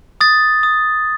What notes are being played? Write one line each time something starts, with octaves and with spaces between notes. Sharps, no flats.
D#6 A6
D#6